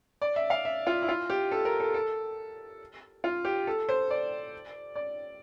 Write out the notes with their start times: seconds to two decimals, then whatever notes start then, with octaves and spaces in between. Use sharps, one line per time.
0.22 D5
0.36 E5
0.50 F5
0.65 E5
0.87 F4
1.02 E4
1.09 F4
1.30 G4
1.52 A4
1.65 A#4
1.80 A4
1.94 A4
3.24 F4
3.45 G4
3.67 A4
3.89 C5
4.10 D5
4.96 D5